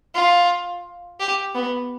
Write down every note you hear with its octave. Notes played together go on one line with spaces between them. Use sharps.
F4
G4
B3